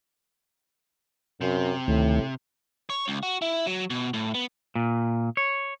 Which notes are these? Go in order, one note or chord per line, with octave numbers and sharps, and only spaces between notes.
F#2 C3
D2 A2 D#3 A3
C#5
C#2
F#4
E4
F#3
B2
A2
B3
A#2
C#5